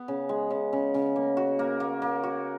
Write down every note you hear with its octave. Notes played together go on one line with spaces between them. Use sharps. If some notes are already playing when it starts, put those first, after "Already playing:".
Already playing: B3
C#3
G#3
C#3
C#3
C#3
A#3
F#4
A#3
A#3
A#3
F#4